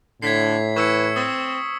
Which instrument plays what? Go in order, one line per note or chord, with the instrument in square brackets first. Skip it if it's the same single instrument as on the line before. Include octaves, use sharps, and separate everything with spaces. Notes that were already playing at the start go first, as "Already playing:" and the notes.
[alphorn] A2 [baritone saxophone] D3 [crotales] G#6 B6 C7
[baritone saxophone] E3 [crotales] C#6 E6 C#7
[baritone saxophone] C4 [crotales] D#6